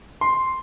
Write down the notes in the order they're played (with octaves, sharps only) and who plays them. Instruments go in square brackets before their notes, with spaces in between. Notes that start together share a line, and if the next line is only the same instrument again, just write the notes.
[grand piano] C6